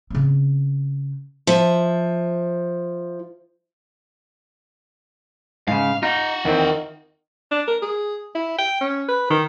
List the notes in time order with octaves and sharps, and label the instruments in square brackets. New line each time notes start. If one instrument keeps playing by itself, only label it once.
[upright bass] C#3 C4
[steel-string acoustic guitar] F3 E5
[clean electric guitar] G#2 C#3 [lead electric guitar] F5
[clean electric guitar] D#4 [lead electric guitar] F4 F#5
[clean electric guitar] E2 C4 [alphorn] D#3
[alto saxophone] D4
A#4
G#4
E4
G5
C#4
B4
D#3